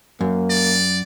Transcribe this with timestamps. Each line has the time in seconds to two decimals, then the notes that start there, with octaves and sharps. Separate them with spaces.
0.21 F#2 A#3
0.50 D5